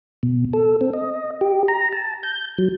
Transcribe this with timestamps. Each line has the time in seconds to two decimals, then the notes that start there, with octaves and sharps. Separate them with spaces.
0.23 B2
0.53 A4
0.81 C4
0.93 D#5
1.41 G4
1.68 A#5
1.93 A5
2.23 G6
2.58 F#3